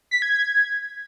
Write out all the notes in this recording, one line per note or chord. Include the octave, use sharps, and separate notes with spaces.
B6
G#6
G#6